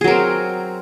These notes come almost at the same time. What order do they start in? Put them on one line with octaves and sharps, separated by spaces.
G#4 F#3 A#4 C4